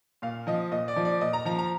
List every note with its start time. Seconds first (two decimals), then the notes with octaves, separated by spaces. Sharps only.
0.22 A#2 F5
0.47 F3 D#5
0.72 A#2 D#5
0.88 D5
0.96 F3
1.05 D5
1.21 A#2 D#5
1.33 A#5
1.45 F3 A#5
1.59 A#5